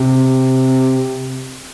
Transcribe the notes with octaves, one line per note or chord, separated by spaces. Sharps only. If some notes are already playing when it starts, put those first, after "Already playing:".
Already playing: C3